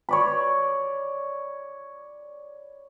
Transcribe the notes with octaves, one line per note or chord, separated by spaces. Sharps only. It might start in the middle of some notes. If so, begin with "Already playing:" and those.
C#5 D5 B5